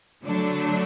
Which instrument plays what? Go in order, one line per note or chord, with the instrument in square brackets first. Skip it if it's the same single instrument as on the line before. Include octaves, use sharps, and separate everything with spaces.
[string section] D3 F#3 A3 D4